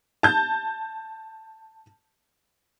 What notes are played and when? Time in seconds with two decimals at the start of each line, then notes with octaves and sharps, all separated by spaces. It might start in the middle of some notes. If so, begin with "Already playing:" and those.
0.23 A5 G6